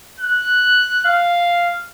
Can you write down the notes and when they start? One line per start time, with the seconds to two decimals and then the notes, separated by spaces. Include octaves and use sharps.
0.20 F#6
1.05 F5